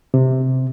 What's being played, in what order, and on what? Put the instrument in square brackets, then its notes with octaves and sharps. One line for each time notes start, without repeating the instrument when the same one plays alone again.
[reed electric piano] C3